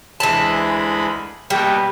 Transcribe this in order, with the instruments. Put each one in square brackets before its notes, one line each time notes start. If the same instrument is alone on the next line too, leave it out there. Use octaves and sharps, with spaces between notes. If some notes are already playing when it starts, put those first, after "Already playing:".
[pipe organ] D2 G#3 B5 [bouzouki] E3 A5
[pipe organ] B2 A#3 B3 [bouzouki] G3